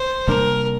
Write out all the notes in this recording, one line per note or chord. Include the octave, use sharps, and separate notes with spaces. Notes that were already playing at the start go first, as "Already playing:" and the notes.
Already playing: C5
C3 G3 A#3 D4 A#4